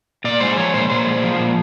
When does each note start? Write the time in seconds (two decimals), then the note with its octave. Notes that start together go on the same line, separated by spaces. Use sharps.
0.24 A#2 D5
0.40 G#3 C5
0.57 F3 C#5
0.74 A#2 C5
0.90 A#2 C5
1.07 G#3
1.23 F3
1.40 A#2